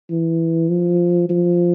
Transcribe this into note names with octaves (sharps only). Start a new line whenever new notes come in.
E3
F3
F3